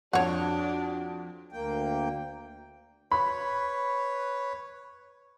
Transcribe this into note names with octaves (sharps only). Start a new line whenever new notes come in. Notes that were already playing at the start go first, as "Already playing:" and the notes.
F2 D4 F#4 C#5 F#5
D2 A#3 G5
B4 C#5 B5